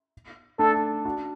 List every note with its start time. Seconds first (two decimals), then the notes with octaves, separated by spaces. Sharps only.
0.59 A3 D4 A4
1.05 D4 F#4